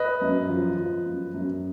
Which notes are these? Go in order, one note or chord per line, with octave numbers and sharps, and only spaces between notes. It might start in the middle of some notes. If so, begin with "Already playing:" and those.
Already playing: B4 D#5
F#2
F3
F3
F#2
F#2